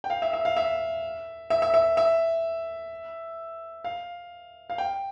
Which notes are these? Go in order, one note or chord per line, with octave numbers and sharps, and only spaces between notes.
G5
F5
E5
E5
F5
E5
E5
E5
E5
E5
F5
F5
G5